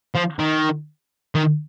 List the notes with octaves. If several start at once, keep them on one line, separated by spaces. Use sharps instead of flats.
F3
D#3
D#3